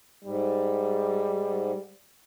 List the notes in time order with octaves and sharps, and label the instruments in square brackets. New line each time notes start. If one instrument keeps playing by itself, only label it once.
[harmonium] G#2 [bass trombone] G3